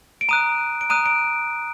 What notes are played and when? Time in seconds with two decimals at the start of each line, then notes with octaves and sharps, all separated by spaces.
0.21 D7
0.29 A#5 D#6 F#6 D#7
0.81 D7
0.90 A#5 D#6 F#6 D#7
1.06 D7